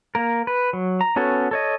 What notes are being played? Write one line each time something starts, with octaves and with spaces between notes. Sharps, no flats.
A#3 A#4
B4
F#3
A#5
B3 C#4 F#4 A4 C#5
A4 C#5 D#5